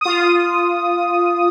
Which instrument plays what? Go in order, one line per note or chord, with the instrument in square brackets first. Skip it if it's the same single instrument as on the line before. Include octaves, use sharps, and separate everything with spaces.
[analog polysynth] F4 D#6